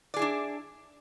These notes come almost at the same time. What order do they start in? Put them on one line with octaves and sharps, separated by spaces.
D5 G#4 E4 D4